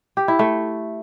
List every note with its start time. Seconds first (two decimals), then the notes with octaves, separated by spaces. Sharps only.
0.17 G4
0.28 E4
0.39 A3